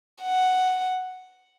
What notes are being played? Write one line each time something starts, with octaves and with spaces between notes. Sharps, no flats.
F#5